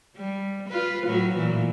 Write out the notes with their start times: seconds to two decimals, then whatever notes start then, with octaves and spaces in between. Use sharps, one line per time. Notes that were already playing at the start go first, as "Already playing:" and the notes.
0.17 G3
0.69 F4 B4
1.06 A2 F#3
1.36 A#2 E3